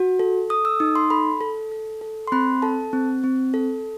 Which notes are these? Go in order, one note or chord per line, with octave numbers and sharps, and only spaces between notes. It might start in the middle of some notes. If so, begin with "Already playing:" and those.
Already playing: F#4
A4
A4 D#6
E6
D#4 D#6
C6
A4 B5
A4
A4
A4
C6
C4 B5
A4 A5
C4
C4
A4